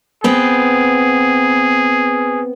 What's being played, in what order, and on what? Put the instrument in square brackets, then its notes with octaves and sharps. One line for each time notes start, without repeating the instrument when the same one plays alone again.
[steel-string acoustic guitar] B3 C4 B4 [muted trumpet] G#4